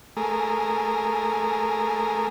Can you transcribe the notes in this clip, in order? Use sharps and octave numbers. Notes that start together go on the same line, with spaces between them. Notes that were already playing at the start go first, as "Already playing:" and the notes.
A3 G#4 A#4